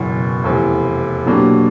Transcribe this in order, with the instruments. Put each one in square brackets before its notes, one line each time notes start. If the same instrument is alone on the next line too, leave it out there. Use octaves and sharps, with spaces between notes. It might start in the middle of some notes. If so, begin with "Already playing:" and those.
Already playing: [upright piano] F#1 E2 B2 F#3
F1 E2 C3
B2 F#3 A#3 D4 G4